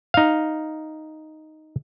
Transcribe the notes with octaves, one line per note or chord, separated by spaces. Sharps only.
D#4 F5